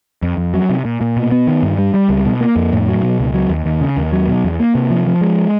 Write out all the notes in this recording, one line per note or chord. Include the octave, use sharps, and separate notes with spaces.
F2
F2
F#3
C3
A#2
A#2
B2
B3
D#3
G2
G3
G3
C#2
B2
A#3
F2
A2
F#3
B2
C#2
F#3
D#2
D#2
C#3
D#2
F#3
B2
E2
A#3
C3
F3
F3
G#3